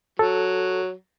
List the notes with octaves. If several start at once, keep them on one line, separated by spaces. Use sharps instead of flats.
F#3 A4